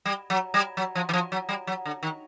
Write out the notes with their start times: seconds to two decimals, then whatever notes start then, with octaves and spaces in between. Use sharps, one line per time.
0.05 G3
0.30 F#3
0.54 G3
0.77 F#3
0.95 F3
1.09 E3
1.13 F3
1.32 F#3
1.49 G3
1.67 F#3
1.85 D3
2.03 D#3